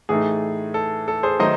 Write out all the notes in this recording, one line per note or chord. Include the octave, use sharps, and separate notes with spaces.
A2 E3 A3 D#4 G#4
A4
A4
G#4 C5
D#3 F#3 A3 D#4 C5 D#5